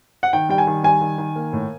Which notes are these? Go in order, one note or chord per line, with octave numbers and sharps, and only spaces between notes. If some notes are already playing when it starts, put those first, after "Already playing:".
F#5
D#3 G5
G3 G5
G#5
D#3
G3 G#5
D#3
D#3
A#3
A2